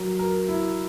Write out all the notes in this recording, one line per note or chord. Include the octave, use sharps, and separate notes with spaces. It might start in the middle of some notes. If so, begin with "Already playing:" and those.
Already playing: F#3 A#4
A#4
E4